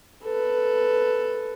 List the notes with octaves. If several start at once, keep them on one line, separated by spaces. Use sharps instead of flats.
A4 B4